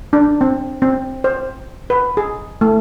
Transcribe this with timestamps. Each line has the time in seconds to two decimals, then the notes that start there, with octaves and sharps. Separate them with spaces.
0.13 D4
0.41 C4
0.82 C4
1.24 C5
1.90 B4
2.17 G#4
2.61 A3